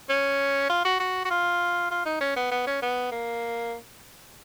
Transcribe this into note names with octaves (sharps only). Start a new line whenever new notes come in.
C#4
F4
F#4
F#4
F#4
F4
F4
D#4
C#4
B3
B3
C#4
B3
A#3